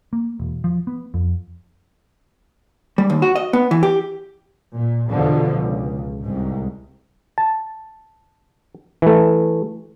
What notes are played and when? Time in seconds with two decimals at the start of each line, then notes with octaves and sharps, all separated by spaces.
0.13 A#3
0.40 E1
0.64 F3
0.87 B3
1.14 F2
2.98 G3
3.10 D#2
3.22 F#4
3.36 D#5
3.53 B3
3.71 E3
3.83 G4
4.73 A#2
5.11 E2 B2 D3 F3
5.55 C#2
6.22 C2 G#2
7.38 A5
9.02 E3 A3